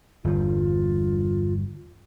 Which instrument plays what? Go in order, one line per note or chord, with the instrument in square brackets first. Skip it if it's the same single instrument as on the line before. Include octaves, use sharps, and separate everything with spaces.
[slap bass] G1 E2 G2 [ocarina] F4